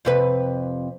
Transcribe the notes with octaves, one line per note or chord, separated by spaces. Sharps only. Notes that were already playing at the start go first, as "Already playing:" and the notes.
F2 C3 B4